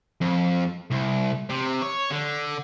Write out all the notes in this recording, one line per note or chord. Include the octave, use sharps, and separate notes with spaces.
F2
C2
C3
C#5
D3